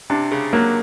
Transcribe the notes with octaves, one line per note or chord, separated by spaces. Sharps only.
C3 D4
C#3
F#3 A#3